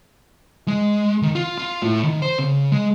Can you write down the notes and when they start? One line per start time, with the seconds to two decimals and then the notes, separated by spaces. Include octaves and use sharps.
0.68 G#3
1.22 D#3
1.35 F4
1.58 F4
1.82 A2
2.03 D#3
2.22 C5
2.39 C#3
2.72 G#3